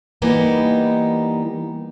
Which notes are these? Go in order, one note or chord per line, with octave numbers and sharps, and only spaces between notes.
E3 G3 A#3 B3 D#4